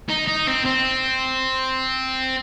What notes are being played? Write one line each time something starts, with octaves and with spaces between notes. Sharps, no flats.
D#4
D#4
C4
C4